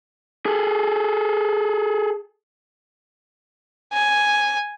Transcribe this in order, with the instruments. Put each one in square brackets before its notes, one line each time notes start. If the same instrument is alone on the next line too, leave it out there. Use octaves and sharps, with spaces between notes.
[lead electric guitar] G#4 A4
[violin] G#5